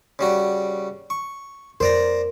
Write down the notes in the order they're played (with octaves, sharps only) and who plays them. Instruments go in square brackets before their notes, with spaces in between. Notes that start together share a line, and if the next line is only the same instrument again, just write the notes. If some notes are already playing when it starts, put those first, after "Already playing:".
[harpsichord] C#3 G3 F#4
C#6
[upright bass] F2 F4 [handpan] A#4 [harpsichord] C5 D5 A#5